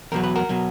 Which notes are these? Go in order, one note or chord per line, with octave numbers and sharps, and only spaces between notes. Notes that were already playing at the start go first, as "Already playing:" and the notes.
E2 B2 F#3 A#4
B4
F#4 A#4
B2 F#3